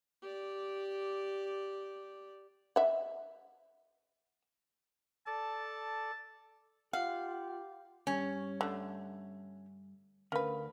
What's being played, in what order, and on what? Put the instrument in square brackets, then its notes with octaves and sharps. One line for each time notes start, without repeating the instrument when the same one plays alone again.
[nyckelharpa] G4 D5
[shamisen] E5 F#5
[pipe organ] A4 D5 [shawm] A5
[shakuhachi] F4 [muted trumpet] G4 [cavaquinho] F5 [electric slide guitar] F#5
[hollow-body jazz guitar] G2 [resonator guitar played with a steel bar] C#4
[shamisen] D3 A3
[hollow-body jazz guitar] D2 [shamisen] C#4 B4 [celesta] A#4 F5